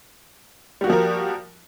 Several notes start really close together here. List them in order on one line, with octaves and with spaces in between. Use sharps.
G3 F#4 A#3 F3 A#4